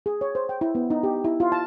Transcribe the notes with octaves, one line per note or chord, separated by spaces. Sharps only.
G#4
C#5
C5
G5
E4
B3
D#4
G4
E4
F4
A5